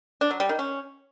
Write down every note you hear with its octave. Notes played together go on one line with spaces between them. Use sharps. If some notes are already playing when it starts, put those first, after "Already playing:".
D4
F#3
G3
D#3
C#4